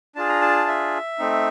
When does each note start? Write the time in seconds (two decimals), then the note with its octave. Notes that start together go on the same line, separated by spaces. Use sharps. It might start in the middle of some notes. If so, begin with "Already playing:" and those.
0.15 D4 F4 G#4 A5
0.29 A#5
0.41 A5
0.67 E5
1.19 A3 C4 D#4